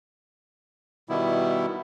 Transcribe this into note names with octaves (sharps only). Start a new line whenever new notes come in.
B2 D#3 G3 B3 E4